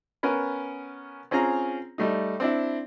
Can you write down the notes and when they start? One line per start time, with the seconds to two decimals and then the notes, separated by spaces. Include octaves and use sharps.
0.23 B3 C#4 A#4 B4
1.31 C4 C#4 F4 G#4 A#5
1.98 G3 A3 D#4
2.40 C4 D4 E4